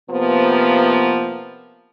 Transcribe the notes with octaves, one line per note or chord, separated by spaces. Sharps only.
C3 F3 A#3 B3